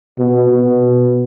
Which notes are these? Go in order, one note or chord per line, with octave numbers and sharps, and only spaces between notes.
B2
B2